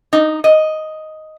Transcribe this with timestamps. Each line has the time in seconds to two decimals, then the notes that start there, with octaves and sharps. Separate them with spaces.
0.13 D#4
0.44 D#5